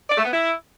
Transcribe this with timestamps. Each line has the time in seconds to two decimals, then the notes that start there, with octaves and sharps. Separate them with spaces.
0.10 D5
0.17 A3
0.25 B3
0.33 E4